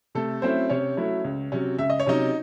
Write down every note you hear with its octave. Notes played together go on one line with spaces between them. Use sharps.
C3 A3 A4
F#3 A3 C4 C#4 E4 C5
C3 C#4 C#5
F#3 A3 C#4 E4
C#2
C3 F#3 C#4
C#2 E5
D#5
C#5
C3 F#3 C#4 D#4 D#5